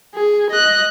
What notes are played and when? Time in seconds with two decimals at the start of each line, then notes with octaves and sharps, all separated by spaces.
0.15 G#4
0.51 D#5 F#6